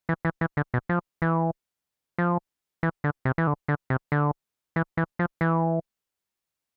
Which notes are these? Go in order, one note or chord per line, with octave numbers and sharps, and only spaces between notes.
E3
E3
E3
D3
B2
F3
E3
F3
E3
D3
C3
E3
D3
D3
C3
D3
E3
E3
F3
E3